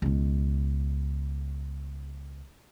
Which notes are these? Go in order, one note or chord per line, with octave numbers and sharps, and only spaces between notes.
C#2 B2